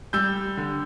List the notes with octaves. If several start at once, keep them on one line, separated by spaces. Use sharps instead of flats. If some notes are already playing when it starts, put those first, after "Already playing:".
G3 E6 G6
D3